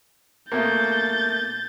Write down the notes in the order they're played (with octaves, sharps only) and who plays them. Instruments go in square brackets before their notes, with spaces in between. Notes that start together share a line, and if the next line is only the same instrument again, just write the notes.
[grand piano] B2 A3 A#3 [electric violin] G6 A6